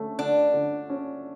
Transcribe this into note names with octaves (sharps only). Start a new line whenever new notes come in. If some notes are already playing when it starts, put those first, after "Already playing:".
Already playing: D3 A3 C#4
D3 D4
D3
C#4